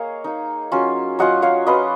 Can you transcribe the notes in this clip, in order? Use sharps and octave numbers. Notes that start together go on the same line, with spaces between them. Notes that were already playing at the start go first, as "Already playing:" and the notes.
Already playing: A#3 G#4 C#5 D#5 F5
A#3 D#4
F#3 C#4 F4
F#3 C#4 F4 D#5 F#5
C#5 F5
F#3 C#4 F4 B4 D#5